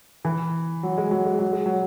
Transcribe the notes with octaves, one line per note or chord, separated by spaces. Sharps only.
E3
F#3
G#3
F#3
G#3
F#3
G#3
F#3